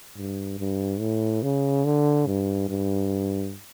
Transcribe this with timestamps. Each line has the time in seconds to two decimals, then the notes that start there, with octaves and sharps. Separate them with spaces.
0.17 G2
0.59 G2
1.00 A2
1.42 C#3
1.85 D3
2.26 G2
2.69 G2